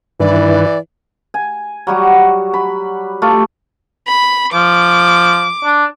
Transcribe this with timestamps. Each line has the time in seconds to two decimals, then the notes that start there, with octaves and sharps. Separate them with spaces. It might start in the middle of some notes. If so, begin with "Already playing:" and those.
0.20 G2 D#3 E3 E4 B4 D5
1.34 G#5
1.87 F#3 G3 F#4
2.54 B5
3.22 A3 F4 G4
4.08 B5
4.54 F3 D6
5.65 D4